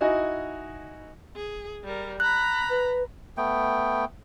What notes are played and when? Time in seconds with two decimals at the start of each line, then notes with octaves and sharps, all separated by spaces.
0.01 D#4 E4 F#4 D#5 G#5
1.36 G#4
1.84 G3 A#4
2.20 A#5 B5 F#6
2.69 B4
3.37 A3 B3 G5